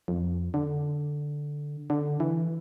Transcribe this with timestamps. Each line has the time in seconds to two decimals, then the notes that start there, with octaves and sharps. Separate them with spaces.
0.08 F2
0.54 D3
1.90 D3
2.20 E3